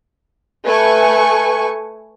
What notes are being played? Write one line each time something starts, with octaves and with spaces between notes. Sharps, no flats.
A3 B4 G#5 C#6